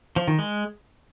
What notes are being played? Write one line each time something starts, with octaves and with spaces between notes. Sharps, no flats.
F3
D#3
G#3